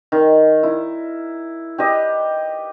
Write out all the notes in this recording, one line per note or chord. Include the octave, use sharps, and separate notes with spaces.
D#3
E4
G4 B4 D#5